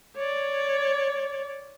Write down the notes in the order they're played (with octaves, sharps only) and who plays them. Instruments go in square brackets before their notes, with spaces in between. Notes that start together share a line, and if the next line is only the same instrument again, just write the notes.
[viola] C#5 D5